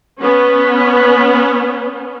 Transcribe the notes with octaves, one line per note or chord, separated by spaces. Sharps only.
B3 C#4